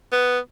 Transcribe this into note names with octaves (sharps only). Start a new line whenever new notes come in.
B3